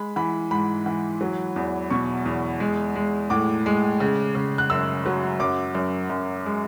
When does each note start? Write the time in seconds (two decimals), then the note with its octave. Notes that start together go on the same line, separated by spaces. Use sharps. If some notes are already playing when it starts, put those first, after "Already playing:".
Already playing: G#3 B5
0.16 E3 B5
0.51 G#2 B5
0.86 E3
1.21 F#3
1.56 E2
1.90 B2 C#6
2.25 E2
2.60 G#3
2.96 G#3
3.30 A2 D6
3.66 G#3
4.00 C#3
4.35 C#3
4.58 F#6
4.70 F#2 E6
5.06 F#3
5.40 F#2 D6
5.75 F#2
6.10 F#2
6.46 G#3